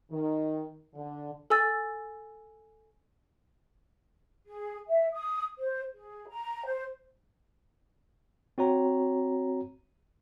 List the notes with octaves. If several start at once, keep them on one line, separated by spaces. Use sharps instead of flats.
D#3
D3
A4 G#5 E6 A6
G#4
E5
D#6
C5
G#4
A#5
C5
C4 F#4 C#5 A#5